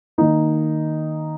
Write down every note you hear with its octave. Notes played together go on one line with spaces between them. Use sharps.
D#3 A#3 D#4